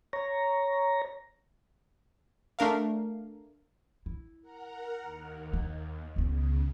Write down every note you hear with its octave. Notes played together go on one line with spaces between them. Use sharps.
C#5 A#5
A3 D4 A#4 F5
E4
A#4 F#5 A#5
D#2
A#3
C#2 C#3 B3